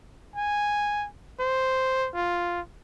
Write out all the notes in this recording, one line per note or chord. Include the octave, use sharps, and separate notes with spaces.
G#5
C5
F4